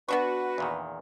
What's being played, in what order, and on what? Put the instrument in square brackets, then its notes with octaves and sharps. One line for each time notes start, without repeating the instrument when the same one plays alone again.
[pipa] B3 D4 C#6 [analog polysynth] F#4 [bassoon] B4
[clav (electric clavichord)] E2 A#2 D#3